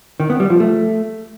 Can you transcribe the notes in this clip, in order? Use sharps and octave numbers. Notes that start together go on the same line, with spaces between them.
D#3
B3
G3
F3
A3